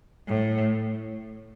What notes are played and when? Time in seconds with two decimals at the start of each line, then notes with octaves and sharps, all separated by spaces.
0.27 A2